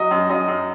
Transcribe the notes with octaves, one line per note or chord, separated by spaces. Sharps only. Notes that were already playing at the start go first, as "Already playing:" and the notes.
Already playing: F#3 D#5
F#2
F#2 D#5
F#2